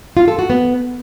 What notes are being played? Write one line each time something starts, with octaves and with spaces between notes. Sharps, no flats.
F4
A4
F#4
B3